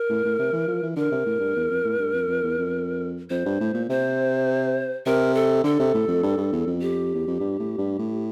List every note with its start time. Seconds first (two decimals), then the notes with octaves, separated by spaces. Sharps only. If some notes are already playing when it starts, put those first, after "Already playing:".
Already playing: A#4
0.10 A2
0.24 A2
0.39 C3
0.52 E3
0.68 F3
0.83 E3
0.96 D3 A#4
1.11 C3
1.26 A2
1.40 G2
1.56 E2
1.70 F2
1.85 A2
1.99 G2
2.14 F2
2.28 F2
2.43 E2
2.58 F2
3.30 F2 C5
3.46 G2
3.60 A2
3.74 A#2
3.89 C3 C5
5.06 C3 A#4
5.34 A4
5.64 D3 A4
5.80 C3
5.94 A2
6.08 F2
6.23 G2
6.38 G2
6.52 E2
6.67 F2
6.81 G4
7.14 E2
7.27 F2
7.40 G2
7.59 A2
7.78 G2
7.99 A2